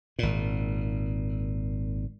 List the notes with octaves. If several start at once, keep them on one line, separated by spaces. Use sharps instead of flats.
G#1 A#2